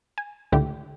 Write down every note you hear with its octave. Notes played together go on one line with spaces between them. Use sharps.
G#5
C#2 A2 D3 G4